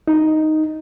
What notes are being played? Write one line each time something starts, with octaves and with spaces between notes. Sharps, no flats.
D#4